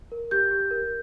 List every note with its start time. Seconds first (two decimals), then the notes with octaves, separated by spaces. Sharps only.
0.12 A#4
0.31 G4 G6
0.51 G4
0.71 A#4